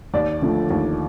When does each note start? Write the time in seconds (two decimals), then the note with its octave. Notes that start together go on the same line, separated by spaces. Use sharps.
0.14 D#2 D5
0.42 D3 F3 A3
0.71 D#2